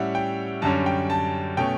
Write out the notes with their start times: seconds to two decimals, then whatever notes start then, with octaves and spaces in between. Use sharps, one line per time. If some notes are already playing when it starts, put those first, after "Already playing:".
Already playing: A2 G3 C#4 E5 F#5
0.15 G5
0.62 F#2 D3 G3 C#4 A5
0.86 G5
1.10 A5
1.57 B2 A3 C#4 G5